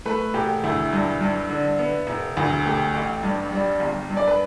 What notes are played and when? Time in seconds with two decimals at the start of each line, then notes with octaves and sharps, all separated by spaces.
0.05 A3 B4
0.34 E1 G4
0.64 D2 E4
0.93 G2
1.21 G2
1.50 D3
1.79 B3
2.07 E1
2.37 D2
2.65 A3 G4
2.94 A1
3.23 G2
3.52 G3
3.80 G1
4.09 G2
4.17 D5
4.28 B4